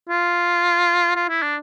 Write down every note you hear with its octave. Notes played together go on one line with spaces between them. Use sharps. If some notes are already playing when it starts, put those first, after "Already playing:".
F4
F4
E4
D4